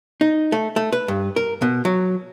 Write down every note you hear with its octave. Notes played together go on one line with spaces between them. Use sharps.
D#4
A3
A3
B4
G2
A#4
B2
F#3